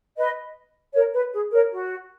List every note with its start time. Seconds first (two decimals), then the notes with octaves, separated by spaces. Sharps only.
0.17 B4 D#5
0.94 A#4 C#5
1.14 B4
1.33 G#4
1.53 A#4 C#5
1.71 F#4